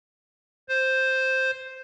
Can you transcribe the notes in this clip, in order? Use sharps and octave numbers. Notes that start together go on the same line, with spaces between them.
C5